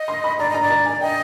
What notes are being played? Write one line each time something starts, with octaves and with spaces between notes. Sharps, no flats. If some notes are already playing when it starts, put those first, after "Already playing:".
Already playing: D#5
C6
B5
D5 A#5
D#5 A#5
D5
A#5
G#5
D#5 G5